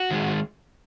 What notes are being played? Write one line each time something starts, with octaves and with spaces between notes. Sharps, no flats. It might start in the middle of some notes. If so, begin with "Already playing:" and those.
Already playing: F#4
D#3 G#3